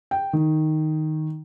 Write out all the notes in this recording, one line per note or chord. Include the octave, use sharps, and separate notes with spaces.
G5
D#3